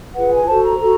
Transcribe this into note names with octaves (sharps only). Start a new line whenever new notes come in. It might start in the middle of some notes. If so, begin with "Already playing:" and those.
F4 G#4 B4 F#5
G#5
F#4 A4 C5 A5
A#5
F#4 A4